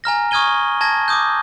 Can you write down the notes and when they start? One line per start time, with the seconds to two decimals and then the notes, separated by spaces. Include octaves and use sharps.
0.04 G#5 A#5 F6 A#6
0.31 C#6 D#6 F6 G#6 D#7 G7
0.81 A5 G#6 A#6
1.08 D6 D#6 G6